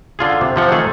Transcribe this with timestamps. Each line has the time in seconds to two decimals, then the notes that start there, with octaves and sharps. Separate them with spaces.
0.19 D3 F4 G#4
0.41 C3
0.56 C3 F3 F#5
0.71 D#3 A3 G#4 A4